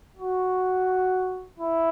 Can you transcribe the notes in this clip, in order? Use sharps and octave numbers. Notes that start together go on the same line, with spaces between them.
F#4
E4